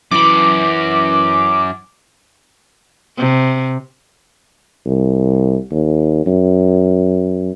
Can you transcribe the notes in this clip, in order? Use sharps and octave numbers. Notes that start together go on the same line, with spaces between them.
F#2 E3 B5 D6
C3
C2
D#2
F#2